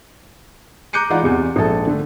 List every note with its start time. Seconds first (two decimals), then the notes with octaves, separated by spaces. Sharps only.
0.93 A#5 D6 F#6 G6 C#7 D#7
1.10 E3 G#3 D#4 F4 D5 F#5
1.22 E2 C3
1.56 A#1 G#2 A4 A5
1.87 D3 A3